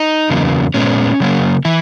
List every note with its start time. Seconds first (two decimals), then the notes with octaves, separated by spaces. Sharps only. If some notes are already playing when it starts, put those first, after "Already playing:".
Already playing: D#4
0.30 E2 C#3 F#3 A#3
0.74 A#2 G#3 B3 C#4
1.20 C#3 F#3 A#3
1.65 E3 E4